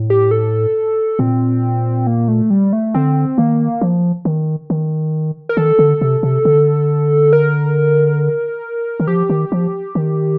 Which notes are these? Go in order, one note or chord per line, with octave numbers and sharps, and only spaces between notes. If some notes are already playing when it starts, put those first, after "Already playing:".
Already playing: A2
G4
A4
A#2 C4
A#3
A3
G3
A3
D3 C4
D#3 A#3
F3
D#3
D#3
A#4
D#3 A4
D3
C3
C3
D3
A#4
D#3
F3 G4
D#3
F3
D#3